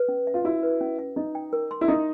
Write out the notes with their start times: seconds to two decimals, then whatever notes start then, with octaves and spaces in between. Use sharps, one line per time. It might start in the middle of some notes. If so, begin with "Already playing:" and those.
Already playing: B4
0.08 C#4
0.27 E5
0.34 F4
0.45 E4 F#4
0.63 B4
0.81 C#4
0.99 E5
1.16 D#4 D#5
1.35 G5
1.53 A#4
1.71 C6
1.81 E4
1.88 D#4 D#5